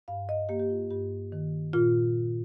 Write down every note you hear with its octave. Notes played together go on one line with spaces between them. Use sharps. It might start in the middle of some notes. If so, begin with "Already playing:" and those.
G2 F5
D#5
A#3 G4
G4
F4
G2 G4
D#3
A#2 F4